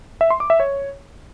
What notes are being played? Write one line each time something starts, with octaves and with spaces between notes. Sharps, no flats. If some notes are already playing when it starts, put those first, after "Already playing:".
E5
C6
D6
E5
C#5